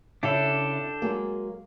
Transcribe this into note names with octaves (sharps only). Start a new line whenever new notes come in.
C#3 D4 E4 G4 A4 E5
F#3 G#3 A#3